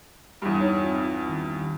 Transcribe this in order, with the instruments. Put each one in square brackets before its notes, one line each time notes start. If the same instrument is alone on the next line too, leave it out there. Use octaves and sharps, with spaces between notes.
[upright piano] E2 G2
[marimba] D#4 C#5
C4 F4
D#3